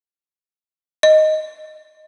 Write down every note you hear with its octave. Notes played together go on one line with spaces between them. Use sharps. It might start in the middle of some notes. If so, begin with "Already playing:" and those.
D#5